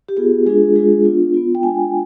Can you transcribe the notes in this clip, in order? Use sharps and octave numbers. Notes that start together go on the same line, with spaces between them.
G4
B3 F4 G#4
G#3 D4 F4 G#4
G#3 D4 F4 G#4
B3 D4 F4
B3 F4
G5
G#3 D4 F4 G#5